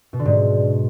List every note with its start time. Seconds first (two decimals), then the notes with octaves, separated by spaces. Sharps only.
0.13 B2
0.19 D3
0.25 G#2